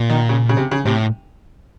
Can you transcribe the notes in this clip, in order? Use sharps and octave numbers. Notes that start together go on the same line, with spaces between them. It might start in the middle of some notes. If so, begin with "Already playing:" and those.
Already playing: A#2
D#3
C#3
C#3
C3
C#3
A2 C3